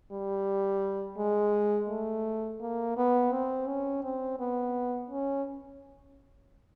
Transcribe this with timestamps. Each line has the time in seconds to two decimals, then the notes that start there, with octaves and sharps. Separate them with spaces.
0.12 G3
1.18 G#3
1.89 A3
2.61 A#3
2.97 B3
3.32 C4
3.67 C#4
4.03 C4
4.39 B3
5.11 C#4